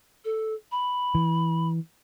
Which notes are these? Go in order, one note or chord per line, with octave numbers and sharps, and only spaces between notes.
A4
B5
E3